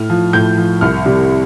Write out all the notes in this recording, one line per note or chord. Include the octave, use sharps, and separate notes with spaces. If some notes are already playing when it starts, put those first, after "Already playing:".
Already playing: A2 F6
F3
A2 G6
F3
C2 F6
C3 G3